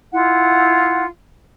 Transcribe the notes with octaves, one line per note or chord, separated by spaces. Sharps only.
E4 F4 F#5